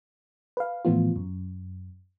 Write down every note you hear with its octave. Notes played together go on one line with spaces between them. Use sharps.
B4 F5
A2 E3 F3 B3 F4
F#2